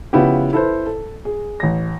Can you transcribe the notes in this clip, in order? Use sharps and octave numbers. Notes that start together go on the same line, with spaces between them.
C#3 F3 B3 E4 F4 G4
E4 A4 B4 C5
A4
G#4
A1 A#6